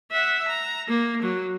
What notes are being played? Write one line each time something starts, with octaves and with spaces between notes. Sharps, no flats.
E5 F#5
A#5
A#3
F#3